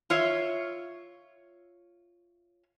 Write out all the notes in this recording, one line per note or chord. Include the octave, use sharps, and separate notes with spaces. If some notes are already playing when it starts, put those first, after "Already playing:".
F4 C#5 E5